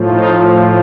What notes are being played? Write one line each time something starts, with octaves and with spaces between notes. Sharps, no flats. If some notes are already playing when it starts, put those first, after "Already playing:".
Already playing: A2 F3
D#4 F4